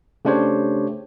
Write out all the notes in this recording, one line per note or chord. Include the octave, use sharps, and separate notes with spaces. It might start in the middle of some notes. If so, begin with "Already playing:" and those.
C#3 A3 D4 G4 C5 C#5